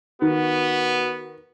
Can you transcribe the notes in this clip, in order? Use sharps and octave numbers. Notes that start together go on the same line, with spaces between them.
D#3 B3 F#4